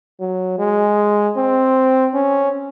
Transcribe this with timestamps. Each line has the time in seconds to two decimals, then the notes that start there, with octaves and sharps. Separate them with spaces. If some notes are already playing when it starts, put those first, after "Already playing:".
0.20 F#3
0.59 G#3
1.37 C4
2.14 C#4